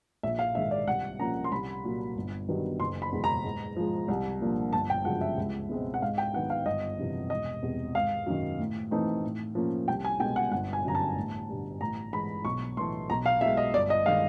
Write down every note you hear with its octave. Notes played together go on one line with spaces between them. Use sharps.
A#1 E5
F5
G#2 D#3 G#3 E5
D5
C2 F#5
A#2 F3 A#3 C#4 A#5
C6
C2 B5
A#2 F#3 A#3
G1
G2 D#3 F#3 B3
F#1 C6
B5
E2 B2 G#3
A#5
G#2
F3 G#3
C2
A#2 F3 A#3 D4
G1 A5
G5
F#2 C#3 F3 G#3 F#5
E5
C#2
B2 G#3 C4
F#5
G#2 F5
G5
D#3 F#3 B3 D#4 F#5
F5
G1 D#5
F2 C3 E3
E1 D#5
E2 C3
G#1 F5
F#2 D#3
A2
E3 A3 C4 D#4
A2
F3 A#3 C#4
C2 G5
G#5
B2 G#3 G5
F#5
G1 F#5
G#5
F#2 D3 A#5
A5
A1
G2 D3
A1 A#5
G#2 E3 G#3 B5
B1 C#6
A2 E3 A3 C6
B1 A#5
F5
B2 G#3 E5
D#5
G1 D5
D#5
D#3 G#3 F5